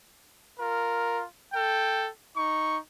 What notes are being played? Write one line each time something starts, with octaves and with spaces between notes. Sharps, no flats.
F4 A#4
A4 G5
D#4 C#6